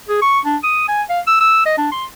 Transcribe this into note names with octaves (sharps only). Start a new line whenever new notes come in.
G#4
C#6
D4
D#6
G#5
F5
E6
E6
D#5
D4
C6